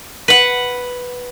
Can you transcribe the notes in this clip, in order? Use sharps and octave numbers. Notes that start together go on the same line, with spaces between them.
B4 F#5